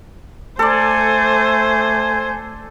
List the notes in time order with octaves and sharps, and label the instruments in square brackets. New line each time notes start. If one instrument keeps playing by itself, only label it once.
[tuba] A3 [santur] A4 D5 [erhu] C5 [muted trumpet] G#5